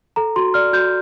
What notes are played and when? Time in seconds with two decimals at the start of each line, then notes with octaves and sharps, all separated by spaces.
0.16 A4 A#5
0.36 F#4 C6
0.54 D5 F6
0.73 F#4 G6